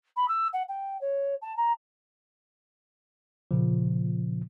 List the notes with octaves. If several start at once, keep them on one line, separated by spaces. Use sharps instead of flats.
B5
E6
F#5
G5
C#5
A5
A#5
A#2 C#3 F3